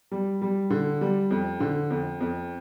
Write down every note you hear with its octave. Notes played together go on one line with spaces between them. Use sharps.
G3
G3
D3
G3
F2
D3
F2
F2